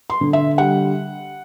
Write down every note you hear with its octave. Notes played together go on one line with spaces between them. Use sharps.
C6
D3
E5
G3 F#5